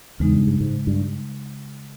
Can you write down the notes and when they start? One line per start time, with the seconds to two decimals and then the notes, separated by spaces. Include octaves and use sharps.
0.19 E2 C#3 G#3 D#4
0.33 G2
0.47 G2
0.60 G#2
0.87 G2